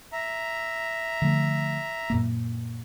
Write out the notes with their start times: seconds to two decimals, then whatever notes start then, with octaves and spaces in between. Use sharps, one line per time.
0.13 E5 A#5
1.22 D3 F3 A3
2.10 F#2 A#2 A#3